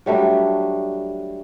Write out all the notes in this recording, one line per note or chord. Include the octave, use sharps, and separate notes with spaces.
F#3 G3 A3 D4